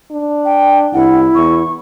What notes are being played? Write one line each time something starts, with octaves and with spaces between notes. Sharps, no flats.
D4
G5
C2 E4 F#5
E2 C#6